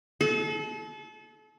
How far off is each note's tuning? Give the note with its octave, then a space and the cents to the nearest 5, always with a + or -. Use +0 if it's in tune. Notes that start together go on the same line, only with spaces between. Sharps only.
A4 -35